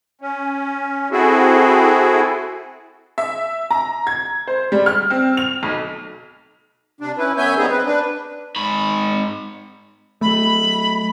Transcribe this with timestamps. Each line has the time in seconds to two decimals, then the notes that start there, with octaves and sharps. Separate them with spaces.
0.21 C#4
1.11 C4 E4 F#4 G#4 A4
3.18 E5
3.71 A#5
4.07 G#6
4.48 C5
4.72 G3
4.86 F6
5.10 C4
5.37 F7
5.63 B1
7.01 C3 D4
7.17 C#4 E4 B4
7.37 F#2 B3 C#5 E5 G#5 G6
7.57 G3 B3 C4 D#4 G#4
7.70 C4 B4
7.86 D4 B4
8.56 G#2 B5
10.21 F#3 A3 B5